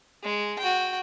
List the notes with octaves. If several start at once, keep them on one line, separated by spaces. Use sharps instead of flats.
G#3
F#4 G5